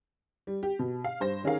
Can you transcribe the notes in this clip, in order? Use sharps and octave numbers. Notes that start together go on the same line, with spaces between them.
G3
G4
B2
F5
G2 C5 A#6
D#3 C#4 G#4 A#4 F5